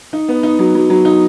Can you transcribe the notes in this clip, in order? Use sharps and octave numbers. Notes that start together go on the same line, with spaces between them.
D#4
B3
D#4
F#3
F#3
F#3
D#4